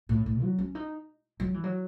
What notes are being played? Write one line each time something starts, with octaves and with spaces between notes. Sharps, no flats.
A2
A2
F#3
C#4
D#4
F#3
E3
F#3